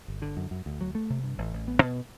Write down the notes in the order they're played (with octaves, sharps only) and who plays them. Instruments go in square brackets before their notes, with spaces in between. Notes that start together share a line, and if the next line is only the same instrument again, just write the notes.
[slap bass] G1
D3
F#2
F#2
D2
F#3
A3
C3
G2
A1
A1
B3
B2